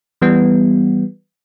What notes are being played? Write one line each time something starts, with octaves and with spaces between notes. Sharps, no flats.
E3 G3 B3